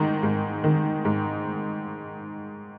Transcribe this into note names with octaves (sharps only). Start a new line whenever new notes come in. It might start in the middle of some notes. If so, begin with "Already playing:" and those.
Already playing: G#2 D#3
G#2
D#3
G#2